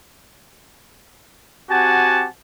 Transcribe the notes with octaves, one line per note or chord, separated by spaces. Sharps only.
C4 F#4 G4 F#5 G#5 A5